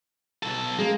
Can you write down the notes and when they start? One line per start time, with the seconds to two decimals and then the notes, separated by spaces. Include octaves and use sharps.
0.43 B1 A4
0.79 G#3 A#3